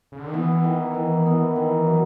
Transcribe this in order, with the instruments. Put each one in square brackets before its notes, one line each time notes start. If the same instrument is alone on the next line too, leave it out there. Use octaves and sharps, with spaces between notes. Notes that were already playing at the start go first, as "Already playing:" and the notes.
[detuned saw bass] C#3
D3
D#3
[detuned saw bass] E3 [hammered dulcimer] B3
[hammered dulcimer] D#3
D#3
B3
D#3
F#3